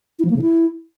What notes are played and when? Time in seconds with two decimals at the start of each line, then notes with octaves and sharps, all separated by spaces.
0.19 E4
0.25 F3
0.30 A#3
0.36 C#3
0.42 E4